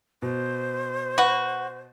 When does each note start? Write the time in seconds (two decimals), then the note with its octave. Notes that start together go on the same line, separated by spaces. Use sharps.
0.22 B2 C5
1.18 F#4 B4 F#5